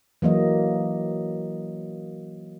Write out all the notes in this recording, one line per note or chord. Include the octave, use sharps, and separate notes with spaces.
E3 F#3 A#3 D#5